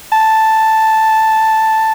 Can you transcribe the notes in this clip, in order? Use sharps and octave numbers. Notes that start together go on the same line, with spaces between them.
A5